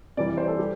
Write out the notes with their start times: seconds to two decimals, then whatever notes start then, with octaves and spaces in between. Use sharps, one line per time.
0.17 C3 E3 G3 D5
0.28 D5
0.37 C5
0.48 A4
0.58 G3 G4